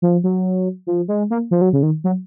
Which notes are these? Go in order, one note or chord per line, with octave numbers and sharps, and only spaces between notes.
F3
F#3
F3
G#3
A#3
F3
F#3
C#3
D#3
F#3